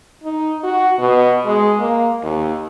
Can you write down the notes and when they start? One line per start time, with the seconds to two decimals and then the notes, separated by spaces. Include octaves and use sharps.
0.24 D#4
0.64 F#4
0.99 B2
1.46 G#3
1.80 A#3
2.23 D#2